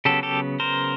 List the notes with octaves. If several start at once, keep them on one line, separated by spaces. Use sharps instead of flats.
C#3 F#3 B3 G4 A4
G4 A4
A#4 C5